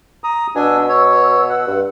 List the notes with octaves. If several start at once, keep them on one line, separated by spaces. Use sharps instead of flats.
A#5 D#6
B2 D4 G#5 E6
C#5
F#5
G2